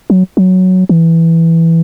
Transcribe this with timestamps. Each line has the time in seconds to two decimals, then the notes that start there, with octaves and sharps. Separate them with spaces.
0.10 F#3
0.37 F#3
0.89 E3